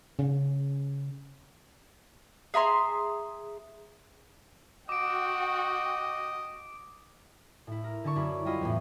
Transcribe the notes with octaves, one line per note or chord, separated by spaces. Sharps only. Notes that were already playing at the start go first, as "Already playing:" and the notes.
C#3
G#4 E5 A#5 C6
F#4 D#5 G5 D6 D7
A2 E4
A#4
D3 D4 A5 C#6
F#2 E4
G3 E4 F4 D#5 F5
E2 A2